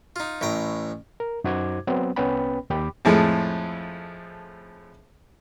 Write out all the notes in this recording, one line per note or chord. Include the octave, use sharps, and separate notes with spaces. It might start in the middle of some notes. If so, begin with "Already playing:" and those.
D#4 F4
A1 A2 G5 A#5
A#4
F#2 D#4 F#4 C5 D6 G#6
F#3 B3 C4
C2 B3 C#4 B4 G5 B5
D#2 G4 G5 B5 D6
F2 A2 F3 G#3 A3